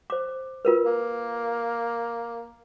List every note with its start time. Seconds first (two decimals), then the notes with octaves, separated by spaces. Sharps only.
0.10 C5 D6
0.65 F4 A#4 B4
0.86 A#3